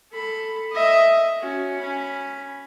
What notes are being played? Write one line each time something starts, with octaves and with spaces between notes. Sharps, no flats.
A4 B5
D#5 E5
C#4 F#4
C#4 B5